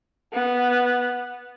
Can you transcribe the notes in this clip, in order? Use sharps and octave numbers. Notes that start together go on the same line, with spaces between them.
B3